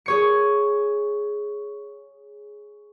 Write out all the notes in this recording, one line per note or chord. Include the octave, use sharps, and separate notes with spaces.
G#4 C#5 C#7